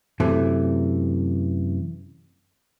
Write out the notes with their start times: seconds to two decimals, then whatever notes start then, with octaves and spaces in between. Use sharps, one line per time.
0.20 F#2 C3 E3 A3